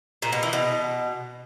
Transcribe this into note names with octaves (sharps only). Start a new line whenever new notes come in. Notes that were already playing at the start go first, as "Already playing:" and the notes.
A#2
B2
E3
B2